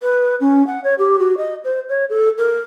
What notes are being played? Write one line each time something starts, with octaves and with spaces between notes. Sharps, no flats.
B4
C#4
F#5
C#5
G4
F#4
D#5
C5
C#5
A4
A#4